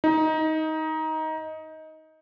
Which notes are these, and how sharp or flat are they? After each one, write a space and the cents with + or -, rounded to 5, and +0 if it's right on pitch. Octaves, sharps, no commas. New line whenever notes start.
D#4 +15